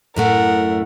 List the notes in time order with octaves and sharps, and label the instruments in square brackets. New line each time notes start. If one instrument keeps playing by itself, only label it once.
[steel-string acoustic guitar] F#2 A2 A3 [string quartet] A#4 F#5